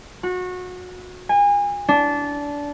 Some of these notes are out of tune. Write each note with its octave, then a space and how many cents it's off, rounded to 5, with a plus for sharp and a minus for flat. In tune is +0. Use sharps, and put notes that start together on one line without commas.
F#4 -25
G#5 -30
D4 -20